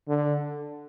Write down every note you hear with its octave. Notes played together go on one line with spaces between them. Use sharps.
D3